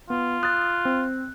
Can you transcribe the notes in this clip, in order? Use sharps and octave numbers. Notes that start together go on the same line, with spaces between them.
B3 F4
D#6 F#6 A6
C4